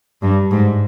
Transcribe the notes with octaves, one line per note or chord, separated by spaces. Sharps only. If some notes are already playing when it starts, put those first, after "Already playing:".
G2
G#2